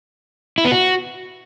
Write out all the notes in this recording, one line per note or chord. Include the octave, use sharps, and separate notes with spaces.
E4
B3
F#4